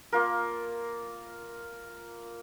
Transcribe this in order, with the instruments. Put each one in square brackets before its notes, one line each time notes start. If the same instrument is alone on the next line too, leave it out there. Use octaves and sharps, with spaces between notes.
[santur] A#3 F4 A#4